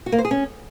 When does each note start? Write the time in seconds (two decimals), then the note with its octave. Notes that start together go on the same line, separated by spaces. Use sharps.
0.06 F#4
0.12 A#3
0.18 C5
0.25 G#4
0.31 C#4